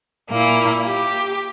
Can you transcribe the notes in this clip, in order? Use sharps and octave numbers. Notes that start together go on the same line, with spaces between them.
A#2 A#3 E4
G4